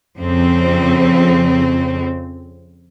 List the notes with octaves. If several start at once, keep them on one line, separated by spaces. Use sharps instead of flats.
F2 C#3 C4